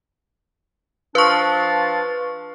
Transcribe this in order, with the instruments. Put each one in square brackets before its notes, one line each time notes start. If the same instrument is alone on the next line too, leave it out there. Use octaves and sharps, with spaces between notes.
[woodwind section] F3 D4 F4 [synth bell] B4 C#6